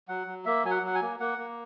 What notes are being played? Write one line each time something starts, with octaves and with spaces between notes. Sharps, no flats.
F#3 F#5
F#3
A#3 E5
F#3 G#5
F#5
F#3 F#5
G#5
A#3
A#3 F#5
A#3